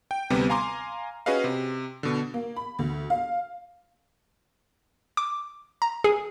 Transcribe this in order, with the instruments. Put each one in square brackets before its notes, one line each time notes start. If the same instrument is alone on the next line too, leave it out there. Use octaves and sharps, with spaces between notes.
[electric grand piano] G5
D2 C3 G3 B3
F5 G#5 A#5 C6 D6
C#4 F#4 G#4 B4 D#5 F5
C3
B2 D3
[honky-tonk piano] A#3
B5
D2
F5
[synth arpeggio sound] D6
A#5
G#4